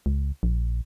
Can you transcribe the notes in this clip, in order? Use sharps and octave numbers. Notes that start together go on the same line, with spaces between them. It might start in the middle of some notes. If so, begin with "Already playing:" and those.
C#2
A#1